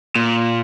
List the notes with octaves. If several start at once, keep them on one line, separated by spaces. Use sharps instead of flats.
A#2